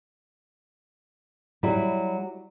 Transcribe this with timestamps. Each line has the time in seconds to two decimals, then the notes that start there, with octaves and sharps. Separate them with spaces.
1.63 F#3 G3 E4